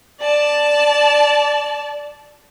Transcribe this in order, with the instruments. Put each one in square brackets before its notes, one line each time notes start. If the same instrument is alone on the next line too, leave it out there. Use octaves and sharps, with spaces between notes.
[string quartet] D5 A5